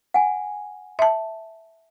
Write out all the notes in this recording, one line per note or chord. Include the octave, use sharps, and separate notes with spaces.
F#5 G#5
E5 A5